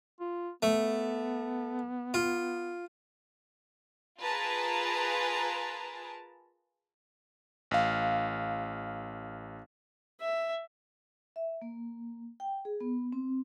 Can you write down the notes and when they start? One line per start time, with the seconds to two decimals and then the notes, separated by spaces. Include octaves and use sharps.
0.20 F4
0.63 A3 B3
2.14 F4
4.20 F4 G#4 A#4 B4 A5 A#5
7.71 A1 F5
10.21 E5
11.36 E5
11.62 A#3
12.40 G5
12.65 G#4
12.80 B3
13.12 C4